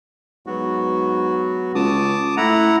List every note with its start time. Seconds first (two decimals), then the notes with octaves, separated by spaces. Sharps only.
0.47 G#2 F#3 B3 F#4
1.75 C#2 A5 D6 D#6
2.37 A2 E4 F#5 A#5